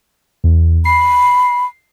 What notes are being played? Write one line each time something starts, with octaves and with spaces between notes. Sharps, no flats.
E2
B5 C7